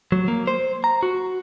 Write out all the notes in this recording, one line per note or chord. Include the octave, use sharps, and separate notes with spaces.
F#3
A#3
C5
A#5
F#4